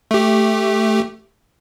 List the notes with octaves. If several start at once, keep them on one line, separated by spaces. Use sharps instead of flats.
A3 G4